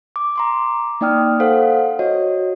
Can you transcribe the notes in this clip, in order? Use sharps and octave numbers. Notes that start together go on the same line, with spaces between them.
D6
A#5 C6 D6
A#3 D#4 D5 G5 D#6 F6
A4 C5 F5 F#5
F#4 C#5 D#5